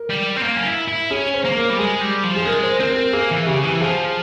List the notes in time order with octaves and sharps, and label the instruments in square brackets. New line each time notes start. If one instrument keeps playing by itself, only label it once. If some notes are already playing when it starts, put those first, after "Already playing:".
Already playing: [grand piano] A#4
[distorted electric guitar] G3
C4
A#3
C#4
E4
E4
[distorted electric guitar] C#4 [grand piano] G#4
[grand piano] C5
[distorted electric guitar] A#3
[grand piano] A#4
[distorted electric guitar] G3
[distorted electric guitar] G#3 [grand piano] G#4
[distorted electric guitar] G3
F3
[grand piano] G#4
[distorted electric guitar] G#3 [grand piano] A#4
[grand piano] C5
[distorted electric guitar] C4 [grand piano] A#4
[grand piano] A#4
[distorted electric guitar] A#3 [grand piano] G#4
[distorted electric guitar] E3
[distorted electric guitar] C#3 [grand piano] G4
[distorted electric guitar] E3
[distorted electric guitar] F3 [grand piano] G#4